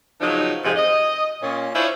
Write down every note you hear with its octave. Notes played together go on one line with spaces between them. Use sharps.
C#3 F3 F#3 B3 D#4
F2 G#2 C3 D#3 F3 G#4
D#5
A#2 C#4
C#4 D4 E4 F4 C5 C#5